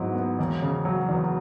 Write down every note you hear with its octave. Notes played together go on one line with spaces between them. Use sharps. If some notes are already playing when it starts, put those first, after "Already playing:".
Already playing: G#2 F#3 B3 E4
B3
E1
C#3
F#3
E2